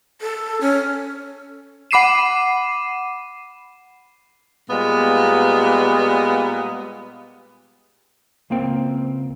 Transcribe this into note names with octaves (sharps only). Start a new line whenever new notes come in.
A4
C#4
F#5 B5 D6 C7 D#7 E7
A#2 G3 G#3 B3
C#2 A#3 C4 G5